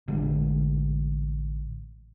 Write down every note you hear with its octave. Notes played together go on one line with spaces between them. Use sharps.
A1 D3 G#3